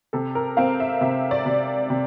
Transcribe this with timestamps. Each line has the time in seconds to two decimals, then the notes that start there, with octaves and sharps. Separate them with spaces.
0.13 C3 A4
0.35 A#4
0.57 C4 F5
0.80 E5
1.01 C3 E5
1.31 D5
1.46 C3
1.90 C3